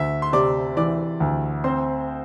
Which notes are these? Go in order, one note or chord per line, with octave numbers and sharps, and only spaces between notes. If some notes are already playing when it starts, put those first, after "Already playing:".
Already playing: D2 E5
C6
C3 D5 D6
E3 D5 D6
D2
C4 C5 C6